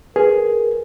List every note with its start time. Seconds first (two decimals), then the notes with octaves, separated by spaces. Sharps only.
0.16 G#4 A#4 B4